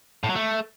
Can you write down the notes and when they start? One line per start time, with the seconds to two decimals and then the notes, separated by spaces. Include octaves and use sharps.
0.24 A2
0.29 F#3
0.35 A3